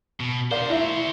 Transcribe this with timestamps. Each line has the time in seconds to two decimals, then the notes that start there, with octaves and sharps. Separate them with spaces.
0.20 B2
0.51 D3 A#4 C5 D5 F5
0.70 E4 F#4 C5 E5